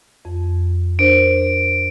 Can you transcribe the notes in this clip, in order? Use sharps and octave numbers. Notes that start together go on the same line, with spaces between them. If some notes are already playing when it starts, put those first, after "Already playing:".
F2
D4 A#4 C5 D7